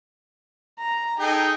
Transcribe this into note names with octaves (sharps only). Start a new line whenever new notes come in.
A#5
D#4 G#4 A4 G5